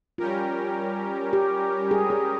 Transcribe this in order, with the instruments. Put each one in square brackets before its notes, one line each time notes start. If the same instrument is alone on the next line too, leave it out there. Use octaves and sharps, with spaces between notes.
[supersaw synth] G3 C#4 G4 A#4 [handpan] F4
[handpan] G4
G#4
G#4